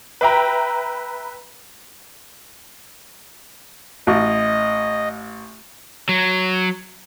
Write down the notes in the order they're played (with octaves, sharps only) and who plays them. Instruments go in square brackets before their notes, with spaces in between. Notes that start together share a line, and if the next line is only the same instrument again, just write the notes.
[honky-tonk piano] B4 E5 G5 A#5
[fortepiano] A1 [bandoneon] D#5
[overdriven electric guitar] F#3